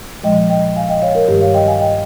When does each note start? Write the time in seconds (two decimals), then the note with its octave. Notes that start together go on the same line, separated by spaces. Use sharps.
0.24 A#2 F3 G#3 D#5 G5
0.50 D#5 G5
0.76 F5 G#5
0.89 D#5 G5
1.02 C#5 F5
1.15 A#4 C#5
1.28 G2 D#3 G3 G4
1.41 C#5 F5
1.54 D#5 G5
1.67 F5 G#5
1.80 D#5 G5